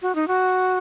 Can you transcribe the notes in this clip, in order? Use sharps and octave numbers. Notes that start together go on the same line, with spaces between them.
F#4
D#4
F#4